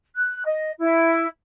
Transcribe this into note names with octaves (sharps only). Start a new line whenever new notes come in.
F#6
D#5
E4